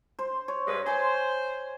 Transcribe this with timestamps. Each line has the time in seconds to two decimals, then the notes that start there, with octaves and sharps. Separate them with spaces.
0.19 C5 C6
0.48 C#5
0.67 G2 G#3 B4
0.86 C5 G#5 C6